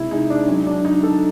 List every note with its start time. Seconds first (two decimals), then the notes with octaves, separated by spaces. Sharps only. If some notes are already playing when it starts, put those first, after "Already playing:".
Already playing: C3 G#3 E4
0.11 G#3 D#4
0.30 D4
0.48 F#3 C#4
0.67 D4
0.85 D3 D#4
1.03 A4